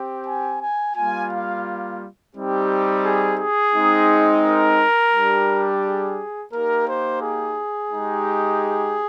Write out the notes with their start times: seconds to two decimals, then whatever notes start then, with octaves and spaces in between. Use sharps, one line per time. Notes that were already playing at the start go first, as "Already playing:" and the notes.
Already playing: C4 G4
0.26 G#5
0.60 G#5
0.95 G3 A#3 F4 G#5
1.31 F5
2.35 G3 C4 D#4 G4
3.05 G#4
3.40 G#4
3.73 G#3 C4 D#4
4.43 A#4
5.14 G3 D4 G4
5.83 G#4
6.53 A#3 D#4 G4 A#4
6.87 C5
7.21 G#4
7.91 G#3 D#4 G4